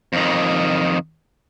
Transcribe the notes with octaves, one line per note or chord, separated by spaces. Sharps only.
F2 D#3